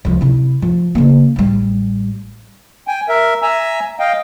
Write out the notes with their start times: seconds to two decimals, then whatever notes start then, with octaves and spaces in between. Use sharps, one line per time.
0.05 C2 F3
0.21 C3 E4
0.62 F3
0.95 C#3 A#3
1.36 A1 G3
2.88 G5 G#5
3.09 A#4 E5
3.42 E5 G#5 A#5 E6
3.99 D#5 F5 G5